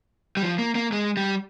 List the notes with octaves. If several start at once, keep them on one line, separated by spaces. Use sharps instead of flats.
G3
F3
A#3
A#3
G#3
G3